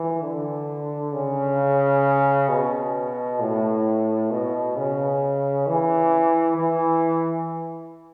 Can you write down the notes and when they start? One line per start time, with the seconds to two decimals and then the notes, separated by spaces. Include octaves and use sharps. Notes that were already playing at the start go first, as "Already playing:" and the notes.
Already playing: E3
0.22 D3
1.13 C#3
2.49 B2
3.40 A2
4.31 B2
4.76 C#3
5.67 E3
6.57 E3